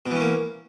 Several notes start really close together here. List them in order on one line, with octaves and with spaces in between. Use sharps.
B2 E3 C#4 A#3